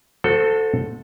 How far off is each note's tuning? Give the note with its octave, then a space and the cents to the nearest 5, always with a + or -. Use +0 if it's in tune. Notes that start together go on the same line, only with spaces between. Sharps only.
F#4 -30 A4 +10 C5 -15